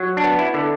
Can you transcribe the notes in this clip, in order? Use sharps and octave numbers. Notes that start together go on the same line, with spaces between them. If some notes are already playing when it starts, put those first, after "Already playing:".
Already playing: F#3
D4
B3
E4
D3